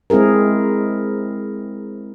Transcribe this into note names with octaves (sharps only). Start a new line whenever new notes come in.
G#3 C4 E4 G#4 A#4